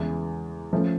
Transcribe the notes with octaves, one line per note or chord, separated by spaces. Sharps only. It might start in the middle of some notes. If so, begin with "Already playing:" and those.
Already playing: E2 C#3 E3 G#3
A2 F3 A3 C#4